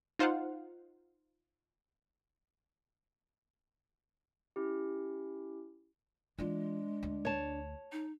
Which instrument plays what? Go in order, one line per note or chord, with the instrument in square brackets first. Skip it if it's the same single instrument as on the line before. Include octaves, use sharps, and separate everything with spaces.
[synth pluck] D#4 F4 C5 F5 F#5
[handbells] C#4 E4 G4
[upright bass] E3 F4 [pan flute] G#3 [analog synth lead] D4
[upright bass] D2
[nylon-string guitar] C#5 A5
[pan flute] D#4